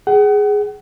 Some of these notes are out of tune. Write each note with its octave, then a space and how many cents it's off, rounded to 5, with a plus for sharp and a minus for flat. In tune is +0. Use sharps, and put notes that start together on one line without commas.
G#4 +0 F#5 +35